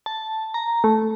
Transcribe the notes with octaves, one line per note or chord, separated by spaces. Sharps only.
A5
A#5
A3